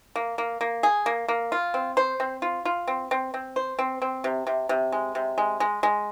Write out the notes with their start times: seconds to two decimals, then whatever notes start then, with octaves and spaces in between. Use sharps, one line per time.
0.16 A#3
0.38 A#3
0.61 A#3
0.83 G#4
1.06 A#3
1.28 A#3
1.52 F4
1.74 C4
1.97 C5
2.20 C4
2.42 F4
2.65 F4
2.88 C4
3.11 C4
3.34 C4
3.56 C5
3.79 C4
4.02 C4
4.24 C3
4.47 C3
4.69 C3
4.92 G#3
5.15 C3
5.38 G#3
5.60 G#3
5.83 G#3